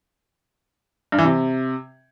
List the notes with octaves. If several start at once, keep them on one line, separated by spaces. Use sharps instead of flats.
G2
E3
C3